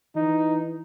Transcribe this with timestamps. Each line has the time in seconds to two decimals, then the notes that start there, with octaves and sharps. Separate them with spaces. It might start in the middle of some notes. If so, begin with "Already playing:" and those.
0.16 E3 D#4